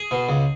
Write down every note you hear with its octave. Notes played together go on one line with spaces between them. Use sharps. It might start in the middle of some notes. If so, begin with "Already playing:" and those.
Already playing: G#4
B2
C#2